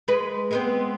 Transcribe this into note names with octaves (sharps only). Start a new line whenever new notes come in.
G#3 B4
G#3 B3 C4